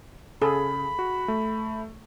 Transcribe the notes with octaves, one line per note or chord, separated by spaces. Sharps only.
C#3 G#4 A4 B5
F#4
A3